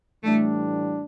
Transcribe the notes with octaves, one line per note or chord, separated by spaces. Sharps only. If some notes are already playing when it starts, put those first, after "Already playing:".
A2 E3 G3 A3 D4